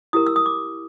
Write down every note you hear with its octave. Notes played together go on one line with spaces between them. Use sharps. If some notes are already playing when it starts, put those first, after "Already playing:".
E4 G4 A#4 D#6
E6
D#6
D6